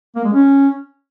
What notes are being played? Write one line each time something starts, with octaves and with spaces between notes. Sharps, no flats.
A#3
G#3
C#4